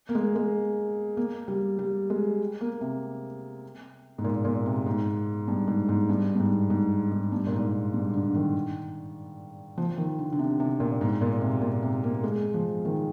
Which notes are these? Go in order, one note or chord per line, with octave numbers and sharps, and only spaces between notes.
A#3
G#3
G#3
A#3
G3
G3
G#3
A#3
C3
G#2
A#2
A#2
C3
G#2
G2
G#2
G#2
G2
G2
G#2
G#2
G#2
G2
A#2
G#2
G2
D3
D#3
F3
D#3
D3
D3
C3
C3
A#2
G#2
A#2
C3
A#2
C3
A#3
G#3
F3
D#3